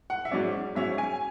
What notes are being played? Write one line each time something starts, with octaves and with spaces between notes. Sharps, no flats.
F#5
E5
G#2 F#3 C#4 D5
G#2 F#3 C#4 E5
G#5